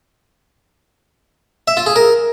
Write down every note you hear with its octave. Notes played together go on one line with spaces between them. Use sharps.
E5
F4
G#4
A#4